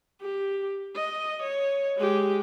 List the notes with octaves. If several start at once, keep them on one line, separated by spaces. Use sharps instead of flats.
G4
D#5
C#5
G#3 G4